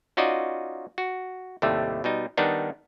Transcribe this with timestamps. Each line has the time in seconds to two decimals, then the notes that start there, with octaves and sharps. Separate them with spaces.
0.17 C#4 D#4 F4 F#4 D5 D#5
0.98 F#4
1.62 D#2 A2 C3 G3 A3
2.04 B2 G3 D#4
2.37 D#3 G3 B3 D4 D#4